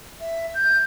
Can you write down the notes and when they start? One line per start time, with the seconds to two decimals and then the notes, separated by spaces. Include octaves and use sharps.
0.20 E5
0.55 G6